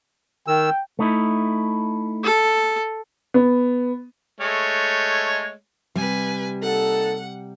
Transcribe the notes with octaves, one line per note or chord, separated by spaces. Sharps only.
D#3 G5 E6
A3 D#4 E4
A4
B3
G#3 A3 C#5
C3 G3 B4 G#5
A#3 D#4 A4 F#5